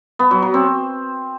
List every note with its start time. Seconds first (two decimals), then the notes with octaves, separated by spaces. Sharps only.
0.19 B3
0.31 F#3
0.42 F#3
0.54 C4